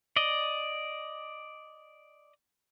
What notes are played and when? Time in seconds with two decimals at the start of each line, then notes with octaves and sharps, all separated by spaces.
0.16 D5 D#5